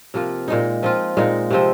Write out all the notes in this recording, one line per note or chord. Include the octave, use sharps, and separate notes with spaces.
C3 F3 A#3 F4
A#2 G#3 D#4
F3 C4 F4
A#2 G#3 D#4
C3 F3 C4